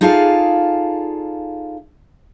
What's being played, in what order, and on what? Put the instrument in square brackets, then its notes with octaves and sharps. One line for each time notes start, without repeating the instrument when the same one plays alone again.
[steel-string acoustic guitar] D#4 F4 G#4 A4 D5 F5